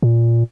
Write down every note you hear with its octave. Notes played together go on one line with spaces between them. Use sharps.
A#2